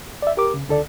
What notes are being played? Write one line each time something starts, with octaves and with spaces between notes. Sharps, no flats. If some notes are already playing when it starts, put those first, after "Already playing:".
D5 E5
G4 A#4 D6
C#3
C#2 D3 A4 D5